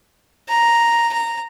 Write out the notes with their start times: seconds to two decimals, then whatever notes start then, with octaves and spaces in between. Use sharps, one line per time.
0.48 A#5
1.12 A#5